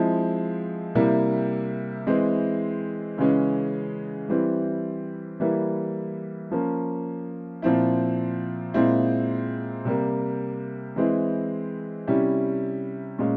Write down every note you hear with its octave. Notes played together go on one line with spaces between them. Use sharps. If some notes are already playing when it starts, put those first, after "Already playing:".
Already playing: F3 G#3 C4 E4
C3 G3 A#3 E4
E3 G#3 C4 E4
C#3 E3 G#3 C#4
E3 G3 C4 E4
E3 G3 A#3 E4
F3 A#3 C#4
A#2 F3 C4 E4
A#2 G#3 C4 E4
C3 G3 A#3
E3 G#3 C4 E4
C3 G3 C#4 E4
A#2 G#3 C#4